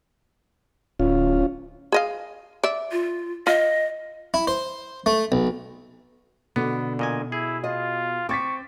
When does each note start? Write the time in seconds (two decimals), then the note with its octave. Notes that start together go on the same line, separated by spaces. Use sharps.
1.00 D1 C#4 F4
1.92 G#4 D#5 F5
2.63 D5 E5
2.92 F4
3.47 F4 D#5
4.34 E4
4.47 C5
5.06 A3
5.32 B1
6.56 B2 D3 B3
6.99 A#2 D#5 G#5
7.32 E4 G#4
7.64 F4 D#5
8.29 C4 C#6 D6 A6 B6